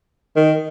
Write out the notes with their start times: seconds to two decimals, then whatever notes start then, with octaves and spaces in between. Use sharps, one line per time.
0.36 D#3